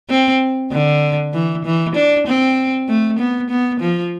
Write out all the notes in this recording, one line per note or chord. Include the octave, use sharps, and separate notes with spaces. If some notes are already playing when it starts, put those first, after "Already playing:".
C4
D3
E3
E3
D4
C4
A3
B3
B3
F3